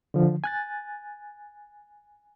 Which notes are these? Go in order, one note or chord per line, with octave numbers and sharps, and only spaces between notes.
D3 F3
G#5 F#6 A6